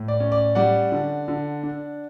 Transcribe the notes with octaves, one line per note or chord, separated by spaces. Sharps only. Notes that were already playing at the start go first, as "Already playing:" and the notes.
Already playing: A2
D5
C#4
D5
G3 D5 F#5
D3
D3
D4